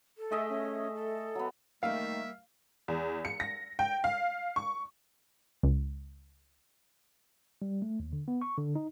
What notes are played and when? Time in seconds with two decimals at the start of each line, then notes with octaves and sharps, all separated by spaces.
0.18 A4
0.32 A3 G#4 D#5 E5
0.49 C#4
0.95 A4
1.35 F#3 B3
1.83 D#3 G3 A3 A#3 E5 F5
2.88 E2
3.25 C#7
3.40 A#6
3.79 G5
4.04 F5
4.56 C#6
5.63 C#2
7.62 G3
7.82 A3
8.00 D#2
8.13 D3
8.28 B3
8.42 C#6
8.58 D3
8.75 D#4